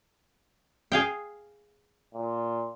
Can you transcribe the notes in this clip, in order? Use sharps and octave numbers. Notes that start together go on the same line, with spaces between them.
G#4 F5 G5
A#2